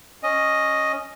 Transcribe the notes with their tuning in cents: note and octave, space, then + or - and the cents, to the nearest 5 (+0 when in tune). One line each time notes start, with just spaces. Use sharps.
C#4 +0 D#5 +0